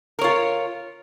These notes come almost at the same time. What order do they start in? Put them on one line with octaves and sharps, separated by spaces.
A#4 C#5 F4